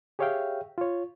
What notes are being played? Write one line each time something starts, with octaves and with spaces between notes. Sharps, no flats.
G4 G#4 C#5 E5 F5 G5
F4 C#5